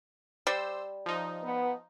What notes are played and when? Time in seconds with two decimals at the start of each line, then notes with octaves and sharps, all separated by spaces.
0.47 G3 C5 E6
1.06 F3 D#4
1.43 B3